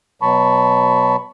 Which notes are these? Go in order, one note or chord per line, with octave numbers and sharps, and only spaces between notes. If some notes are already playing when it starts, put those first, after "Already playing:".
B2 F#3 A5 B5 C#6